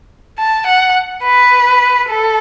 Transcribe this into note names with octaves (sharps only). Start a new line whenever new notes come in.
A5
F#5
B4
A4